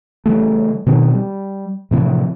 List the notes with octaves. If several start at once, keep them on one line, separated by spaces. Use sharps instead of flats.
C#3 E3 G3 A3
B2 D#3 C4
G3
A2 C3 E3 F3